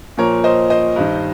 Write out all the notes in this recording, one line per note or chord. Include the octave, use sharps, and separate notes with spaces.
A#2 F3 A#4 C#5
C5 D#5
C5 D#5
G2 D#3